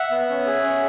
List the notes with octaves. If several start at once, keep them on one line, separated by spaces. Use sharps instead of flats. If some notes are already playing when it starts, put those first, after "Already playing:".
Already playing: E5 F#5
B3
C#4
G#4
C#4